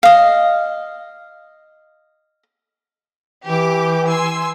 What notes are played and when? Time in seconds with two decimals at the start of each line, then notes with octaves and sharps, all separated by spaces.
0.03 D#5 F5
3.47 E3 G4 D6
4.09 G#5 C6 E6